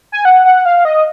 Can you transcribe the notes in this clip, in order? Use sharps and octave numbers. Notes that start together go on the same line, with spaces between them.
G#5
F#5
F#5
F5
D#5